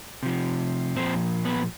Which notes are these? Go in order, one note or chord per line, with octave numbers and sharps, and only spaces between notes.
C3 F3
A#2 F3 C4 C5
B3 B4